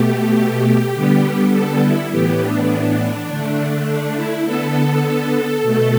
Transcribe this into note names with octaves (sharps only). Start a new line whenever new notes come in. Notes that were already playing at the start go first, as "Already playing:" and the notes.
Already playing: B2 A3 G4
D3 G3 B3
A4
E4
A2 E3 B3 G4
D4
D4
D3 A3
D4
E4
D3 B3 A4
B2 A3